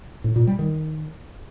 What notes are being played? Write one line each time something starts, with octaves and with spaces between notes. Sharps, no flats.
A2
A#2
G3
D#3